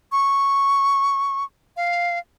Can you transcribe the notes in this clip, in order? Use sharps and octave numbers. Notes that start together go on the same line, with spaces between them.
C#6
F5